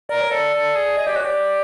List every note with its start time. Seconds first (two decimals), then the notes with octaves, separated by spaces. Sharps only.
0.09 A#4 D5
0.21 C#5
0.31 A4 D5
0.54 A4
0.75 G#4
0.97 G#4 D#5
1.07 G4 D5
1.16 F#4 C#5
1.25 G4 D5